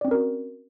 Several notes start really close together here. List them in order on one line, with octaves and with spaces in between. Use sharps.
D5 C4 C#4 A#4 F#4